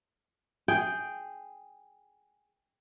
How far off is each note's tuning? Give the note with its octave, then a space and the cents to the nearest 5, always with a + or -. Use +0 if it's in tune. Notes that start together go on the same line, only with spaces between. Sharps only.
G#4 +0 G5 +0